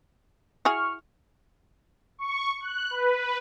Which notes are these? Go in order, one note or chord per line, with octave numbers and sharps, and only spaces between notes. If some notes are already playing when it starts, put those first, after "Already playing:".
E4 F#4 G#4 C#6 F6
C#6
F#6
B4